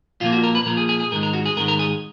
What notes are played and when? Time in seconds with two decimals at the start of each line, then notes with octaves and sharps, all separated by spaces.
0.21 A#2 F3 A#3 F4
0.32 F#4
0.43 A#4
0.55 B4
0.66 A#2 F3 A#3 A#4
0.77 G#4
0.89 G#4
1.00 G#4
1.12 G#2 D#3 G#3 A#4
1.23 A#4
1.34 F#4
1.46 G#4
1.56 G#2 D#3 G#3 A#4
1.68 A#4
1.79 G#4